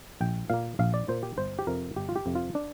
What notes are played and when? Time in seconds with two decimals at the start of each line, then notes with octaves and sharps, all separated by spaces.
0.21 A#1 G5
0.50 A#2 A#3 F5
0.79 A#1 F5
0.94 D5
1.08 A#2 A#3 C5
1.23 G4
1.38 G1 C5
1.59 G4
1.67 F2 C3 F3 A#4
1.96 G1 G4
2.09 F4
2.16 G4
2.26 F2 C3 F3
2.35 F4
2.55 D4